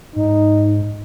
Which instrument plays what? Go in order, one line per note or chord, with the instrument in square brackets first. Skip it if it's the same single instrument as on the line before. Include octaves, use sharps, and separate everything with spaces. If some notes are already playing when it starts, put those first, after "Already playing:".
[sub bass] G#2 [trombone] D#4